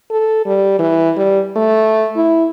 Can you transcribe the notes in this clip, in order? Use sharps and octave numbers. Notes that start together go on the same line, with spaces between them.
A4
G3
E3
G3
A3
E4